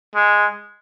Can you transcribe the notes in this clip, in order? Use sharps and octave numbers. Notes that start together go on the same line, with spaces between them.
G#3